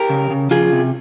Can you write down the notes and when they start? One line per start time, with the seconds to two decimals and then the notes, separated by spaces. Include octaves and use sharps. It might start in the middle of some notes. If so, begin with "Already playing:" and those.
Already playing: G4 A#4
0.09 C#3
0.30 C#3
0.51 F3 F4 G#4
0.73 C3